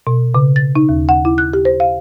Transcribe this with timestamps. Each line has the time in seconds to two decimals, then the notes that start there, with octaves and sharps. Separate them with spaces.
0.07 B2
0.34 C#3
0.56 A6
0.75 D#4
0.89 D#2
1.09 F#5
1.25 E4
1.38 F#6
1.53 G4
1.65 C5
1.80 F5